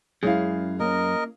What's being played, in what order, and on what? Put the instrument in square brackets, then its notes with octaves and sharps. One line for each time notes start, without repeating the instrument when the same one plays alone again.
[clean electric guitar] F#2 [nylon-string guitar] G#3 C#4 E4 [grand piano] G#4 F5
[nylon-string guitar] A#3 C#4 [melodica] A#4 D#5